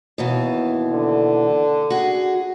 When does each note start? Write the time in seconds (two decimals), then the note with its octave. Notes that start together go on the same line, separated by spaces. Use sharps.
0.18 D#2 B2 E3
0.92 D3
1.90 F#4 G#4